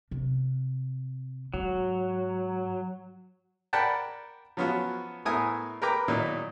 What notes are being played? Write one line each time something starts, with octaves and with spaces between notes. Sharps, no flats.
C3
G#2 F#3
A#4 D5 F#5 G5 A5 B5
F3 F#3 B3 C#4 F4 F#4
A2 B3 A#4 E5 G#5 D#6
A#4 B4 G5 A#5 D6
A#2 D#3 F#3 D#4 E4